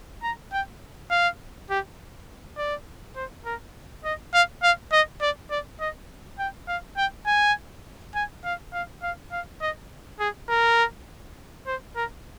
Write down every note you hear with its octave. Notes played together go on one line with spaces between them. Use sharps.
A#5
G5
F5
G4
D5
C5
A#4
D#5
F5
F5
D#5
D5
D5
D#5
G5
F5
G5
G#5
G#5
F5
F5
F5
F5
D#5
G#4
A#4
C5
A#4